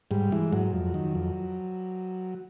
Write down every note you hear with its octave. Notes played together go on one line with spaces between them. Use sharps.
G#2 G3
E3 G#3
G#2 F#3
F2
D#3
F2